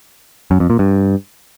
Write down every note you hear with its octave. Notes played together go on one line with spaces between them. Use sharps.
F#2
F2
A#2
G2